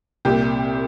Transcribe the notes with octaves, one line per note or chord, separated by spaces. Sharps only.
C2 A#2 G4